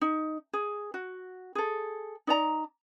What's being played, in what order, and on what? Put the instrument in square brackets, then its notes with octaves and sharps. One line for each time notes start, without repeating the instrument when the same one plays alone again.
[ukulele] D#4
G#4
F#4
G#4 A4
D#4 D5 A#5